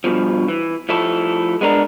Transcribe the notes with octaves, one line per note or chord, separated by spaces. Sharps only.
G2 B2 F3
E3
F3 A3 E4 A4
G#3 B3 D4 A#4